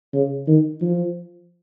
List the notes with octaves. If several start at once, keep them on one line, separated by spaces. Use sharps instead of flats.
C#3
D#3
F3